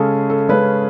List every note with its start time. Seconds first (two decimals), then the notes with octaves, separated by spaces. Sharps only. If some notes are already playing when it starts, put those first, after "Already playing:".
Already playing: C#3 G#3 C#4 G#4 A4
0.30 A4
0.49 C#3 G#3 C#4 B4